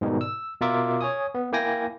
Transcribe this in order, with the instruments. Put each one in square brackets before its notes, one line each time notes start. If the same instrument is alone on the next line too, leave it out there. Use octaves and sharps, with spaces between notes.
[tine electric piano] G#2 B2 D#3 G3 D#4
E6
B2 F4 A#4 E5 D6
C#5 G#5 D#6
B3
A#3 E4 G5 G#5 A#6